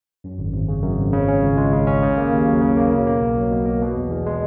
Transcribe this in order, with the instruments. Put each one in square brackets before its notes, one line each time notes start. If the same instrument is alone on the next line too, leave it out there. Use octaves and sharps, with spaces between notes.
[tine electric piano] F#2
G#1
G#1
C#3
F#2
G#1
C#3
C#4
C#2
G#3
C#3
C#4
C#3
A#3
D#2
F#3
C#3
A#3
B2
A#3
B1
F#3
B2
A#3
B2
E2
E2
G#3